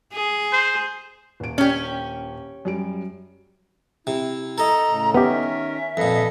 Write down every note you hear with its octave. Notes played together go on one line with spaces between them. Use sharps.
G#4
C5
D#1 D7
C#4 G4
F#2 G3 D7
C3 E4
A4 D#5 A#5
A2 C#3
D#3 B3 C#4 G4 A#4 E5
F2 A#2 A4 B4 D#5